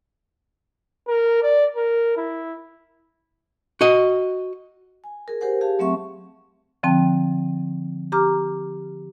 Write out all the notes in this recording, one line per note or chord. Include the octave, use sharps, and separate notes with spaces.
A#4
D5
A#4
E4
F#4 D#5
G#5
G#4 A#4
G4 A#4 C5 F#5 G#5
G4 G#4 F5 A5
F#3 A3 C4 E5 F#5 C#6
D3 F3 C4 G5 A5
G4 A#5 D6 F6